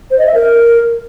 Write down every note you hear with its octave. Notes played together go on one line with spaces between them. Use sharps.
C5
D#5
E5
A#4